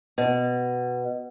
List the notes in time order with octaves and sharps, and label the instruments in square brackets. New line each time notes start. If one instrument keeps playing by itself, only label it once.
[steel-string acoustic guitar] B2